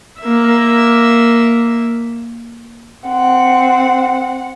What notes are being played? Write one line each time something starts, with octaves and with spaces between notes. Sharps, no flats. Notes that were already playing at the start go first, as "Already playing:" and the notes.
A#3 E5
C4 F#5